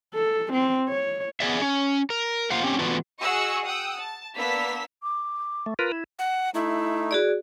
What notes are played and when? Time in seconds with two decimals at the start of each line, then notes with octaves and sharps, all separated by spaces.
0.15 A4
0.53 C4
0.89 C#5
1.40 B3 G#4 D5 E5
1.62 C#4
2.10 A#4
2.50 A#3 F4 C5 F5 F#5
2.63 C4 C#4 G4
2.79 E3 A3 B3 D4 F4 F#4
3.21 F#4 G#4 D#5 F#5 C#6 E6
3.64 F#5 G5 D#6 E6
3.99 A5
4.35 A#3 B3 D4 E6 B6
5.02 D6
5.66 A3
5.79 F4 A#4 B4
5.92 E4
6.19 F#5
6.55 A3 D#4 E4
7.11 F#4 G#4 D5